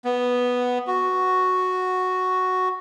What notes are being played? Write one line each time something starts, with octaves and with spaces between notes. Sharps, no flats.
B3
F#4